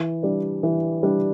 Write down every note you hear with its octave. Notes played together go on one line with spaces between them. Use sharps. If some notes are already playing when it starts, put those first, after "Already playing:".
Already playing: E3
G3 D4
E3
G3 D4